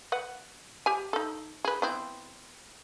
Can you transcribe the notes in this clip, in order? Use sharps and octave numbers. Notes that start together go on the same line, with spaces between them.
B4 F#5
G4 G#5
D#4 A4
G#4 B4
B3 C4 E4